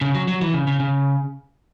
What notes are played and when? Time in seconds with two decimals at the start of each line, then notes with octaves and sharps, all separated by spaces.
0.01 C#3
0.15 F#3
0.28 F#3
0.41 E3
0.54 C#3
0.67 C#3
0.80 C#3